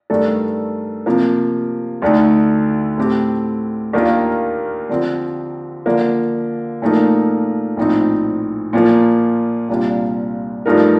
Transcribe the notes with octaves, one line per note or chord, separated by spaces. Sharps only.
G2 D#3 A3 D4 A4
C3 F3 A#3
D2 D3 A3 D#4
A2 A3 C4 G4
D#2 D#3 A#3 D4 F4
D3 F3 C4
D3 F3 A#3
A#2 F3 A3 D#4 A#4
A#1 A2 F3 C4 D#4
A#2 F3 A#3
C2 A#2 G3 D4 F4
G2 F3 A3 D#4 A#4